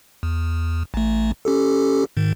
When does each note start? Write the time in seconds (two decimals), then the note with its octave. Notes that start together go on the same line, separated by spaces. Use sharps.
0.23 E2
0.94 A1 A3
1.45 C#4 G4 A4
2.17 G#2 D#3